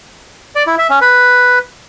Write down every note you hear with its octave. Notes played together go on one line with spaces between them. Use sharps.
D5
E4
E5
C#4
B4